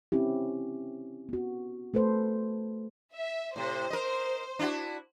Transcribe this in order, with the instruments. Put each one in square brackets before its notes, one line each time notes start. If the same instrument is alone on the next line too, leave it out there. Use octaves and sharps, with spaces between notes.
[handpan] C4 C#4 E4 G4
B3 F#4
A3 A4 B4 C5
[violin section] E5
[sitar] A2 C3 [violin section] C5
[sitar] A#4 D#5
D4 E4 F#4